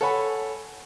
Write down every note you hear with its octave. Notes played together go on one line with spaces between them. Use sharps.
A4 C#5 F#5 G#5 B5